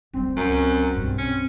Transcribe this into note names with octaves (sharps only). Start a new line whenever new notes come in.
F1 G3 C4
C#2 F#2
B1 G2
C#4